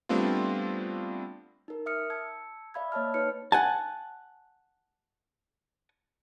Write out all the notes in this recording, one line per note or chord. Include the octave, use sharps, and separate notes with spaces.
G3 A3 B3 C4 D4 F4
D#4 A#4
E5 D#6 F6 C#7
A5 E6 G#6 C#7
D5 E5 F5 B5 E6 G#6
A#3 C#5 D#5 A5 F6
D#4 B4 C#5 F6 C#7
F#5 G#5 A5